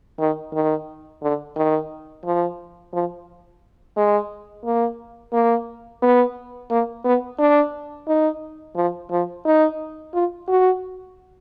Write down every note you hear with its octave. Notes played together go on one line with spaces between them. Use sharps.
D#3
D#3
D3
D#3
F3
F3
G#3
A#3
A#3
B3
A#3
B3
D4
D#4
F3
F3
D#4
F4
F#4